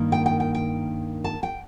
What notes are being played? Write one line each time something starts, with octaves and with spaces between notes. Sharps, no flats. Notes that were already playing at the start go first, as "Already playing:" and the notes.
Already playing: G2 D#3 A#3
G5
G5
G5
G5
A5
G5